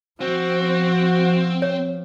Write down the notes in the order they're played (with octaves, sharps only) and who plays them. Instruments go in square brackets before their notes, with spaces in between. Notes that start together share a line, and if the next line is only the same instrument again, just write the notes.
[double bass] F3 [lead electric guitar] C4 [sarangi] F#4
[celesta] C#5